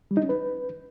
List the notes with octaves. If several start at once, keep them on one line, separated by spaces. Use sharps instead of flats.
G3
D#4
C#4
B4